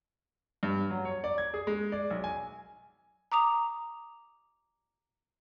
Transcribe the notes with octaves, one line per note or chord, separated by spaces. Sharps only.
G2
F#3
C#5
D5
G#6
G#4
G#3
D5
B1
G#5
A#5 D6 D#6 F7